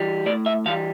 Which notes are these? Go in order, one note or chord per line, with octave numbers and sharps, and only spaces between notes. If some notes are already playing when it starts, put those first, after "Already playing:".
Already playing: E3 G3
A2 D5
E5
E3 G3 F5